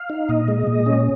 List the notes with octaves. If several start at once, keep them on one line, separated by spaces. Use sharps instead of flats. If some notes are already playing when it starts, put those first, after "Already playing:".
Already playing: F5
D#4
A#2 D#5
G#3
A#2
C#4